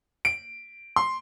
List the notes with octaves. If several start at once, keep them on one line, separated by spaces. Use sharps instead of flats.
D7
C6